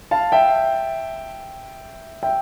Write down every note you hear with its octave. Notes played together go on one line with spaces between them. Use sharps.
F5 A5
E5 G5
E5 G5